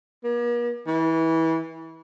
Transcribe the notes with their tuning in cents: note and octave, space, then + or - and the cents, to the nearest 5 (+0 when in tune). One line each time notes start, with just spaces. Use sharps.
A#3 +45
E3 -25